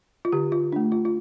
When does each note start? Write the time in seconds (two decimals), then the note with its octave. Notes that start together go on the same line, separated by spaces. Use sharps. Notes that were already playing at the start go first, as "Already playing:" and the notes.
0.25 F4
0.33 D3 G4
0.52 F4
0.72 A3 D4
0.92 F4
1.05 F4